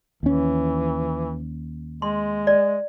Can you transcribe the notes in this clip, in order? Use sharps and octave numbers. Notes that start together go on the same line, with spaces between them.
D#2 E3 C#4
G#3 C6
D5